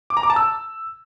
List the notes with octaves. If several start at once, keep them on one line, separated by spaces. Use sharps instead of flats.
D6
A#5
D6
A5
E6